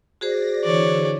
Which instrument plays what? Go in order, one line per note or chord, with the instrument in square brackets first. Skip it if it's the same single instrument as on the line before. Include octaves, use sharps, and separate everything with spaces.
[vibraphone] F#4 G#4 C5 [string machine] D5 A#6
[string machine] D3 E3 [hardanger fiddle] C#5 D5